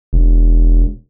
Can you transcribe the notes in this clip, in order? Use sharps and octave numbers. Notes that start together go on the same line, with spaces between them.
E1